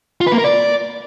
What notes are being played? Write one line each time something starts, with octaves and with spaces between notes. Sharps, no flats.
F4
B4
A#3
A#4
D5